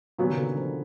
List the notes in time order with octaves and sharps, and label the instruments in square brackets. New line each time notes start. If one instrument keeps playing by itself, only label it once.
[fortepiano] A#2 F#3 B3 [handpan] D#3
[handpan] C#3
D3
F3